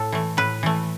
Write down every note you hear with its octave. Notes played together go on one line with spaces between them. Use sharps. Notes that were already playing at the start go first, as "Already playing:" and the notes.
Already playing: A2 A4
E3 A3
A2 B4
E3 A3